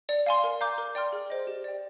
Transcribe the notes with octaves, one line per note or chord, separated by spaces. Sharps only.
D5
F5 G#5 C6
A#4
F5 A#5 D6 G6
A#4
D5 G5 C6 F6
G#4
C5 D#5
G4
D5 G5